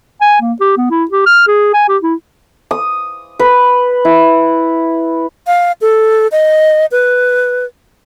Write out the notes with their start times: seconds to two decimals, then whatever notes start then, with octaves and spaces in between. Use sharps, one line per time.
0.21 G#5
0.41 A#3
0.61 G4
0.77 B3
0.91 E4
1.11 G4
1.26 F6
1.48 G#4
1.74 G#5
1.89 G4
2.02 E4
2.71 D#6
3.39 B4
4.05 E4
5.47 F5
5.81 A4
6.32 D#5
6.92 B4